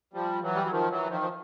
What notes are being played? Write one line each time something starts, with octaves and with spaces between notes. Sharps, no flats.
F3 G3
E3 F#3
G3
F#3
D#3 F3
E3 F#3
D#3 F3
F3